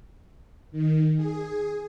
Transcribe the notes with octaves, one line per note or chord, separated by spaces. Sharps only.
D#3
G#4